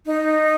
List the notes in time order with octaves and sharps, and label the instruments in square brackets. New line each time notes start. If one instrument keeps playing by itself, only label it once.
[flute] D#4